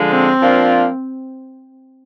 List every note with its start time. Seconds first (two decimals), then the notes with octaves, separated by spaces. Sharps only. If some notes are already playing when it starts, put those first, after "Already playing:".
Already playing: D3 F3 G#3
0.11 C4
0.40 F3 A#3 D4 F4